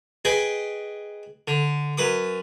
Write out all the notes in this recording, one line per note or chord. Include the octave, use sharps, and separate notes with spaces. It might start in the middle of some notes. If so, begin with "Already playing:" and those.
G#4 B4 D#5 G5 G#5
D3
F#2 B4 D#6